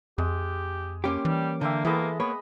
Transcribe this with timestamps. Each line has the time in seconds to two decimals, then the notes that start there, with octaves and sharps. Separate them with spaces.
0.18 F2 G#3 G4
1.04 A#3 C#4 G4 G5 C6 D6
1.25 E3 G3
1.61 D3 A#3 E5 G5 C6
1.85 E3 G#3 A#3 B3 E4 A4 D#5
2.20 A#3 B3 B4 C#5 B5